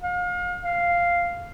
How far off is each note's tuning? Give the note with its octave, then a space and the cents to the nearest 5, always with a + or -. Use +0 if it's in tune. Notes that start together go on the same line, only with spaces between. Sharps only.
F5 +35
F5 -5